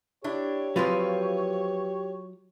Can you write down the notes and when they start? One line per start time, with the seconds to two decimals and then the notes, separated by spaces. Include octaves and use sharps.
0.24 D4 E4 G4 C#5
0.76 F3 F#3 C4 F4 B4